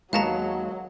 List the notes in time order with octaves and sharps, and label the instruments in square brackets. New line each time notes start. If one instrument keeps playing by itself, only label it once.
[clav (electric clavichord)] D#2 B3 F#4 [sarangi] F#3 [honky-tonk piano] G#3 [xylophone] F5 A5 A#5